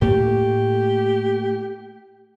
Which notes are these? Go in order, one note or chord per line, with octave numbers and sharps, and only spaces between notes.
A2 A3 A#3 G4